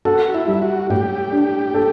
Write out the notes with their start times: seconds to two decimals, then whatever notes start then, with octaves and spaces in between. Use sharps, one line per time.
0.05 F#4 A4
0.34 E4
0.47 G3
0.62 F#4
0.90 A2 G4
1.32 D4
1.74 A4